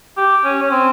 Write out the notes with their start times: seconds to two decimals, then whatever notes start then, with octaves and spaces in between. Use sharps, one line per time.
0.17 G4
0.44 C#4
0.62 C#4
0.71 C4